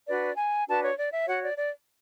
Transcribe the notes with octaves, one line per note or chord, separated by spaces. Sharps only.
D4 F#4 B4 D5
G#5
D4 F#4 B4 A5
C#5
D5
E5
F#4 C#5 F#5
D5
D5